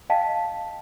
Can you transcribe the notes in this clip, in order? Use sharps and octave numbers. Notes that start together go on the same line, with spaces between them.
D#5 F5 G5 A5 B6